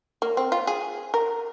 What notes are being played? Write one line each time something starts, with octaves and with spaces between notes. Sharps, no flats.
A#3
C4
F4
G#4
A#4